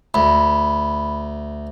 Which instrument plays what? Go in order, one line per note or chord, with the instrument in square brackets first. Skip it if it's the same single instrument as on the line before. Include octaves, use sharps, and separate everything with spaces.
[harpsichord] D2 [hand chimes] B5